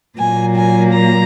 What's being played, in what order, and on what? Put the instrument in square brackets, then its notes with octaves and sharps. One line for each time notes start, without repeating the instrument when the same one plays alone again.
[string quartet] A#2 F#3 A#3 G#5
G#5
A#5